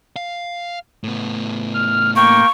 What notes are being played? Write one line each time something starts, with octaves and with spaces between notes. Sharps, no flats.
F5
A2 B3
F6
A#3 G5 C#6